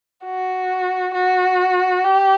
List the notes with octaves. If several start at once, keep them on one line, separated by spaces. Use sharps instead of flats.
F#4
F#4
G4